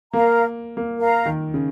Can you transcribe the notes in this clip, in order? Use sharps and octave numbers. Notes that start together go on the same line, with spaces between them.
A#3 A#4 F5 A#5
A#3
A#4 F5 A#5
D#3
C#3